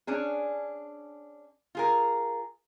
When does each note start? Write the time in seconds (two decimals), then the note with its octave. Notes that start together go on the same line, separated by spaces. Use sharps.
0.07 C#4 D4 G#4
1.75 F4 G#4 A#4